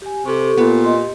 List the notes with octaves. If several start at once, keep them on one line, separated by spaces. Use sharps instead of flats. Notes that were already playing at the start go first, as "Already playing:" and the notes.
G4 G#5
C3 G4 A4 C#6
A#2 B3
G4 D#5 C6